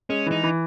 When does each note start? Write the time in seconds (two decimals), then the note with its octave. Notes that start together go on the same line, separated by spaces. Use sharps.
0.09 G#3 C#4
0.26 E3
0.32 D#4
0.43 E3